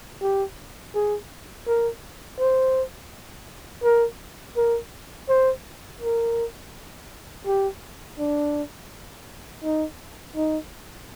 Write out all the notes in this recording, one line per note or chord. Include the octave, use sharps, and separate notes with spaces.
G4
G#4
A#4
C5
A#4
A#4
C5
A#4
G4
D4
D#4
D#4